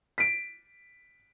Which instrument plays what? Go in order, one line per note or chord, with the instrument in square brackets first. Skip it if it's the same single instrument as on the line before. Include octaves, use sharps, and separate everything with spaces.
[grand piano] B6 D7